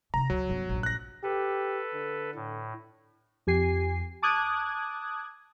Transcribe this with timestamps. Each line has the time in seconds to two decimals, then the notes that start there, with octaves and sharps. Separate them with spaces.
0.14 C3 D#4 A#5
0.30 C#2 F#3
0.50 G1
0.69 A#1 G2
0.83 F#6 A#6
1.23 G4 A4 B4
1.93 D3
2.35 A2
3.47 F2 G4 G#5 C7
4.22 A5 D6 D#6 F#6 G#6